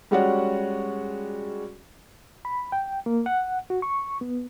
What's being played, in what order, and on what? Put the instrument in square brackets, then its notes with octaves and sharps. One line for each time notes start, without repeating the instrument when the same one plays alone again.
[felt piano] G3 G#3 C#4 F#4 D5 F#5
[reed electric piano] B5
G5
A#3
F#5
F#4
C#6
B3